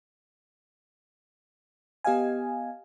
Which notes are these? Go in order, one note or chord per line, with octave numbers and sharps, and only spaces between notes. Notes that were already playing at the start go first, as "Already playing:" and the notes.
B3 G4 D#5 F5 G#5